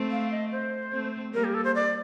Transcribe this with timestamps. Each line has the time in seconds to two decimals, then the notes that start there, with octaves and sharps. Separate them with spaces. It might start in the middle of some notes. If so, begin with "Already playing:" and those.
Already playing: A3 C4
0.11 F5
0.31 D#5
0.52 C5
0.92 A3 C4
1.33 G3 A#3 A#4
1.44 G4
1.54 A4
1.64 C5
1.75 D5